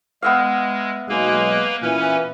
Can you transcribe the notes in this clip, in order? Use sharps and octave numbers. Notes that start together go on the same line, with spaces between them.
G#3 B3 E5 F5
B1 G#3 A#3 B4
A#2 E3 C#4 B4